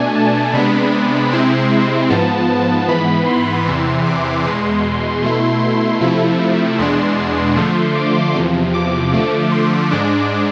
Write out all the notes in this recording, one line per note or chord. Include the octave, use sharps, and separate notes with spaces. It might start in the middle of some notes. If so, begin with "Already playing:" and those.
Already playing: B2 A3 D4 G#5
A5
C3 G#3 B3 D4 B5
C3 G#3 C4 E4 C6
C6
G#2 F3 B3 A5
G#2 E3 B3 B5
C6
E2 C3 E3
D6
E2 B2 G#3 C6
B2 A3 E4
C3 F3 A3 E4
E2 B2 G#3 D4 C6
D3 F3 A3
D6
E2 C3 F3
D6
D3 F3 A3
C6
G#2 G#3 D4 D6